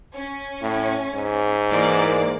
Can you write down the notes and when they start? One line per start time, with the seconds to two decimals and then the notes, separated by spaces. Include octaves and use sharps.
0.15 C#4
0.62 A2
1.14 G#2
1.71 E3 A#3 D5